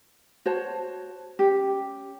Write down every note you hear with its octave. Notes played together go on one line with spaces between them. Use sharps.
F#4 C5 C#5 A5
C#4 G4